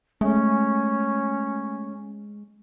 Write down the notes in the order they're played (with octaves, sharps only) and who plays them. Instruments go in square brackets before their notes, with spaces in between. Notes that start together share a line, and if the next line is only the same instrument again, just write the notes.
[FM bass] G#3 [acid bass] A3 [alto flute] C#4